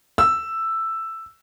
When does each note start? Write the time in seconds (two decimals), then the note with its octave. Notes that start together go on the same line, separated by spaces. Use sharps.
0.18 E6